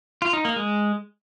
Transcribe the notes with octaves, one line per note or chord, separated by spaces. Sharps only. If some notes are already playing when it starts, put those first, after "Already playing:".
F4
D#4
A#3
G#3